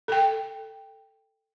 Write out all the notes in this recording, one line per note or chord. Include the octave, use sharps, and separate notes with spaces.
A4 G5